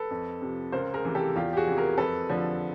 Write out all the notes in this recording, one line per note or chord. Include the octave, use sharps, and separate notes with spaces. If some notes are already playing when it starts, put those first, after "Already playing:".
Already playing: A4 B4
F2
C3 F3
C#2 A#4 C5
G#4 A#4
C3 E3
G4 A4
E2 F4 G4
G4
F#4 G#4
C3 E3
G#4 A#4
F2 A4 B4
D3 F3